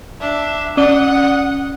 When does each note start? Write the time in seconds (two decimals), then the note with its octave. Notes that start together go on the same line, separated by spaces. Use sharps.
0.20 D4 E5
0.77 C#4 D5 F#5 D#6 G7